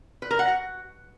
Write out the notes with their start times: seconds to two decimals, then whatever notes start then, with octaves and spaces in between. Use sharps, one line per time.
0.22 B4
0.31 A#4
0.39 F#5
0.47 F#4